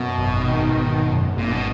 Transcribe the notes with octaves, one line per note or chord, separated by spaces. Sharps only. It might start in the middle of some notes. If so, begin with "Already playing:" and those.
Already playing: F#2 B2
G#1
D#3
G#1
F#2
G#1 A#2
B2